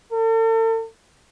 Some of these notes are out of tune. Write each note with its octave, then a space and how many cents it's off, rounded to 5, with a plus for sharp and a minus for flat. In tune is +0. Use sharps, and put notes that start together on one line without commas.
A4 +40